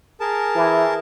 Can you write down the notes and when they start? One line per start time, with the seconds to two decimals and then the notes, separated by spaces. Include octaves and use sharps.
0.20 G#4 A#4 A5
0.55 E3